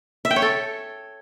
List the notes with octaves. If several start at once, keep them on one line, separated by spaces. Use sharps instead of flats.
E5
G5
C#5
A4